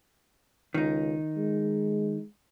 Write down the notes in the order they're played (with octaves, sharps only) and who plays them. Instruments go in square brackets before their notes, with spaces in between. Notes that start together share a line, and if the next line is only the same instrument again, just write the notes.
[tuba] C#2 [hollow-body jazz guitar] D#3 D#4
[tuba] G#3